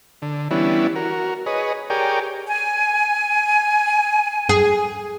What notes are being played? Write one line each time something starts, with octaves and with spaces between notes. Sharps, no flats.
D3
E3 G3 B3 C#4 D4 E4
F#4 A#4
G#4 B4 C#5 D#5
G4 G#4 A#4 C#5 D5 G5
G#5
G#4